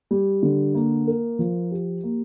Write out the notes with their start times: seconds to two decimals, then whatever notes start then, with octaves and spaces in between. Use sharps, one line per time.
0.11 G3
0.43 D3
0.75 A#3
1.07 A#4
1.39 F3
1.71 G4
2.03 A#3